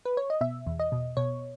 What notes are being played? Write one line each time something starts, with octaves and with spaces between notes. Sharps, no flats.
B4
C#5
D#5
B2 E5
E2
D#5
B2
B2 C#5